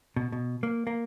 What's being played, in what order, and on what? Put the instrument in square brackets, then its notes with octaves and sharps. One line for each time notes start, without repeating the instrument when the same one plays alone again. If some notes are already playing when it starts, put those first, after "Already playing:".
[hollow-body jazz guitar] B2
B2
A#3
A#3